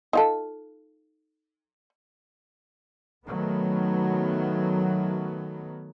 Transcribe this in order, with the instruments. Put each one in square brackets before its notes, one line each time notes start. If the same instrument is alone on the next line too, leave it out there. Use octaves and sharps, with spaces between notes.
[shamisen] D#4 F4 A4
[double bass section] D#3 F#3 A3 B3